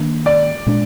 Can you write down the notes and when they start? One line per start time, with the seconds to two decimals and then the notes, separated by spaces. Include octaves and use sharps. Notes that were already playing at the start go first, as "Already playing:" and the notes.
Already playing: D#3 A#3 D4
0.26 D5
0.66 A#2 G#3 D4